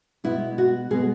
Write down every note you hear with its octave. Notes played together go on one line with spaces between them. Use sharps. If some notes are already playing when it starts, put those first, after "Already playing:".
B2 G#3 B3 E4
F#4
B2 G#3 B3 G#4